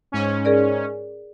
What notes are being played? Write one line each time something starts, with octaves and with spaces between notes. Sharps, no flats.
G#2 C#4
G#4 A#4 D5